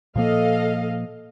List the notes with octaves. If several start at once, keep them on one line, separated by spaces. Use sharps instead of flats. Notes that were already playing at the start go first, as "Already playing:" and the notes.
A#2 F3 A#3 A4 D#5 F5